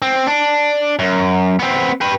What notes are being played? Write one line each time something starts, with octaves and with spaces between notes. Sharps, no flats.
C4
D4
F#2
B3 C4
G4 B4